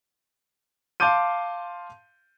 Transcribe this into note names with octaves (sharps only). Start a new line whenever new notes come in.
F5 A5 C6 D6 G6 D#7